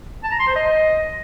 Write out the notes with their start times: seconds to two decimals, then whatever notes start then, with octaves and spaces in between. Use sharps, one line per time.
0.23 A5
0.31 A#5
0.39 C6
0.47 C5
0.55 D#5